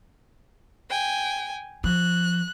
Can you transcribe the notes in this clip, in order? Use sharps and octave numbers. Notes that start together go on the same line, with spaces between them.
G5 G#5
F3 F#6